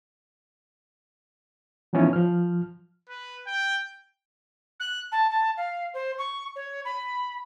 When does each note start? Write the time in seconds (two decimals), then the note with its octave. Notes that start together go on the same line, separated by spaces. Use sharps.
1.93 E3 F3 B3 C#4 D#4 E4
2.13 F3 F6
3.09 B4
3.47 G5
4.80 F#6
5.12 A5
5.30 A5
5.57 F5
5.94 C5
6.18 C#6
6.56 C#5
6.85 B5